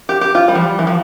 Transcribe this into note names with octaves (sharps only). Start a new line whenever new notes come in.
G4
G4
F4
G3
F3
G3
E3
F3